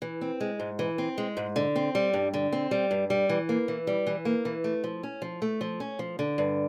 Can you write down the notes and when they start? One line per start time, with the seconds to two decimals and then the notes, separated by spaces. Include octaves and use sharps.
0.02 E3
0.21 C4
0.40 G#3
0.60 G#2
0.79 E3
0.98 C4
1.18 G#3
1.37 G#2
1.56 D3
1.76 C4
1.95 G3
2.14 G2
2.34 D3
2.52 C4
2.71 G3
2.91 G2
3.10 G3
3.29 E3
3.49 A#3
3.68 E3
3.87 G3
4.07 E3
4.25 A#3
4.45 E3
4.64 A3
4.84 F3
5.03 C#4
5.22 F3
5.42 A3
5.61 F3
5.80 C#4
5.99 F3
6.19 D3
6.38 G2